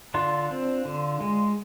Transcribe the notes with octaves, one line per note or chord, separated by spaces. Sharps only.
D3 D4 F4
C4
D3
G#3